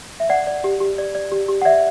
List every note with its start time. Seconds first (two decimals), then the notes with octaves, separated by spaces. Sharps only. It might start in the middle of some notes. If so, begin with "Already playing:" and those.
0.20 E5
0.29 D5 F#5
0.47 D5
0.64 G4
0.80 G4
0.98 D5
1.15 D5
1.32 G4
1.48 G4
1.62 F#5
1.65 D5 E5